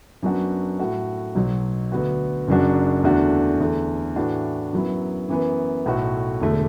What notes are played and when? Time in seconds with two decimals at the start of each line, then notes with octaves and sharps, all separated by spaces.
0.22 F#2 F#3 B3 D4 F#4
0.79 A2 A3 F#4
1.35 B1 B2 F#3
1.92 D2 D3 B3 F#4
2.48 F#1 F#2 F#3 D4 F#4
3.04 E2 D3 A3 D4 F#4
3.60 E2 D3 A3
4.16 A2 E3 D4 F#4
4.73 F#2 F#3 B3 E4
5.29 F#2 E3 B3
5.86 B1 A2 A3 F#4
6.41 E1 D2 D3 A3